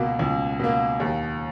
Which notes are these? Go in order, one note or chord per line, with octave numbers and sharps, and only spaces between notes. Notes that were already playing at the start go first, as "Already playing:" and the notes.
Already playing: C#2 B2 A#3
C#2
B2 A#3
D#2